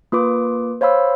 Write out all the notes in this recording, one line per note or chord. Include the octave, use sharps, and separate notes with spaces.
A#3 F4 B4 D6
C5 C#5 F5 B5 E6